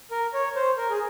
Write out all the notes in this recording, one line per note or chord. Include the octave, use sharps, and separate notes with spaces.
A#4
C#5
C5
A#4
G#4